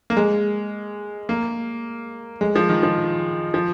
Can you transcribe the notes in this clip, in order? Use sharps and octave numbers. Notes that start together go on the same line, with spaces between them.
A#3
G#3
A#3
G#3
F3
D#3
F3
F3